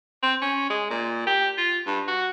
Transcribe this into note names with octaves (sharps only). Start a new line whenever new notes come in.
C4
C#4
G#3
A#2
G4
F4
G2
F#4